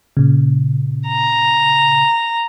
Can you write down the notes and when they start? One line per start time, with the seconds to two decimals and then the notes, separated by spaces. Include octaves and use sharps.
0.17 A#2 C#3
1.08 A#5